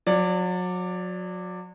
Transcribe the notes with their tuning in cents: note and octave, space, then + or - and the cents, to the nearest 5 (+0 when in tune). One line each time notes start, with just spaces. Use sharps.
F#3 -35 D5 +0